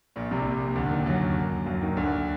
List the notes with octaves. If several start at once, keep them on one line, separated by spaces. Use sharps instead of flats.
A#1 A#2
C2 C3
D2 D3
D#2 D#3
F#2 F#3
F#2 F#3
D#2 D#3
D2 D3